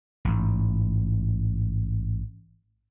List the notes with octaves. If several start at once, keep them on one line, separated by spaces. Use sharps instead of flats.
A1 G#2